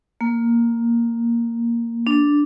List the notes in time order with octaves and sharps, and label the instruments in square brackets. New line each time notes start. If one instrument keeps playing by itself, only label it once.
[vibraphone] A#3
D4